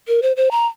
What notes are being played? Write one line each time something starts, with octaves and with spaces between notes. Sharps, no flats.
A#4
C5
C5
A#5